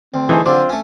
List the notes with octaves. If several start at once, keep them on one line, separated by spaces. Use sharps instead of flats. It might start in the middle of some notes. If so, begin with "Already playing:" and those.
D2 C4
E3 A3 D#4 G#4 C5 G#5
D3 F#3 C4 D4 F4 C5 D6
A3 C#4